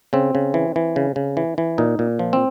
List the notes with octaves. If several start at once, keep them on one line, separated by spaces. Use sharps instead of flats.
C#3 C4
C#3
E3
E3
C#3
C#3
E3
E3
A#2 D#4
A#2
F3
C4